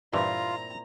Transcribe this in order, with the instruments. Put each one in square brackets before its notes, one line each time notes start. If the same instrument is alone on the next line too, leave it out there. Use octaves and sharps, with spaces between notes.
[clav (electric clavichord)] G2 E3 [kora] A#2 C4 E4 [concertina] F4 [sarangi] A#5